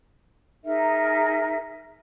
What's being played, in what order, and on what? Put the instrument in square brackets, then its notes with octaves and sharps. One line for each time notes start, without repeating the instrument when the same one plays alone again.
[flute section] D#4 G#4 A#4 E5